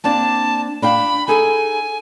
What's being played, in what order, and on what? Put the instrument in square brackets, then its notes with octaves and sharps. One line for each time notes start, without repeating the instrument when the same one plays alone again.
[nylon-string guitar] A#3 C4 D4 [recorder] A5
[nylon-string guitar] D4 F5 G5 [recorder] B5
[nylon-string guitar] D#4 G#4 A4 [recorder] G#5